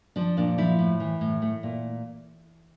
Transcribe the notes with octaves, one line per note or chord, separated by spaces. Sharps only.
F3 D4
A#2 D4
F3 E4
A2
E3
A2
A3
A#2